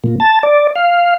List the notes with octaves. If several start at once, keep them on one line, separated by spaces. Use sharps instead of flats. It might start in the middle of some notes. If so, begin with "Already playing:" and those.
A#2
A5
D5
F5